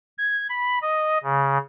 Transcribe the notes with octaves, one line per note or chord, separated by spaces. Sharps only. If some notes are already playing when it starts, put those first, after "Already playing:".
G#6
B5
D#5
C#3